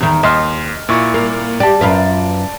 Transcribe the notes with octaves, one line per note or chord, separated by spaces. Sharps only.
E2 D#3
D#2 D#5 C6 F6
A#2 E4 C#6
A#3
G4 D5 A5
F#2 F4 B4